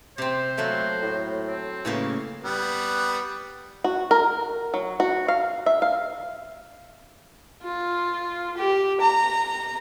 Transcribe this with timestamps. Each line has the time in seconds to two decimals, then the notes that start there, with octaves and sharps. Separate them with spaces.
0.18 C3 C4 C5
0.58 F#3 A3 A#3
1.02 A2
1.48 C4
1.85 A2 C#3 E3 A#3
2.44 G3 B3
3.84 F#4
4.11 A#4
4.74 F#3
5.00 F#4
5.28 F5
5.66 E5
5.82 F5
7.63 F4
8.57 G4
9.00 A#5